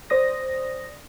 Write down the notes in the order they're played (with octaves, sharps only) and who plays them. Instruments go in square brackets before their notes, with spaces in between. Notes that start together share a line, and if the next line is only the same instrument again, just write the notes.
[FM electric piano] C5 D5 D#6 A#6